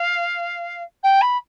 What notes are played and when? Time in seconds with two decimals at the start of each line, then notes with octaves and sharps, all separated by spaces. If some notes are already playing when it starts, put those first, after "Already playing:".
Already playing: F5
1.03 G5
1.22 B5